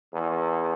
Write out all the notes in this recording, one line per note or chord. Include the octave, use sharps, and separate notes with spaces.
E2